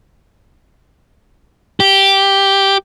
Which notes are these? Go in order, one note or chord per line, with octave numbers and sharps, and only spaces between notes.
G4